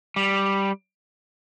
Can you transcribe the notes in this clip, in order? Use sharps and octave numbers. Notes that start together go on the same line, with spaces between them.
G3